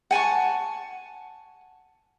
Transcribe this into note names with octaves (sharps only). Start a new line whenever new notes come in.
F#5 G#5 A5 C#6